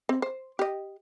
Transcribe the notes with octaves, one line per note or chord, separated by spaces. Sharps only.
C4
C5
G4 D#5